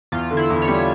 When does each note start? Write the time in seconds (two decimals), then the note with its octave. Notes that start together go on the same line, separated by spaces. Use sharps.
0.12 E2 F4
0.31 D3
0.37 E4
0.50 E2
0.62 C#5
0.68 G3